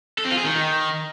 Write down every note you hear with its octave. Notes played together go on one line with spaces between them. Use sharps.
A4
C4
F4
G#4
D#3